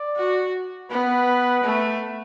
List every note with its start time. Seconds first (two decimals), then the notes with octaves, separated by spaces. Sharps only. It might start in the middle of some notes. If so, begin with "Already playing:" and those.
Already playing: D5
0.17 F#4
0.91 B3 B4
1.63 A3